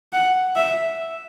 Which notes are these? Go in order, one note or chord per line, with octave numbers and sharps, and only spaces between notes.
F#5
E5